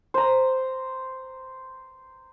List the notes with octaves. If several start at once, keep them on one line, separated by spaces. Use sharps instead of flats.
C5 A#5